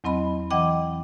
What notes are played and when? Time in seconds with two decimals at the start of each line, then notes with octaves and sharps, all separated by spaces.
0.04 E2 F#3 C4 D#5 B5
0.51 E3 D#5 F#5 G5 D6